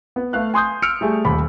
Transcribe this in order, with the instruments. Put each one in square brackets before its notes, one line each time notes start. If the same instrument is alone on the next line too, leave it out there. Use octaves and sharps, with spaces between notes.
[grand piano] B3
A3 B4 F5 F#6
G#5 C6 D#6 G6
E6 F6 C#7 D7
G3 A3 G#4
D#1 D#2 B5